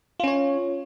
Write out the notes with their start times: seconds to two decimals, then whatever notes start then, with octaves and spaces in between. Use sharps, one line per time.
0.20 F4
0.24 C#4
0.27 C#5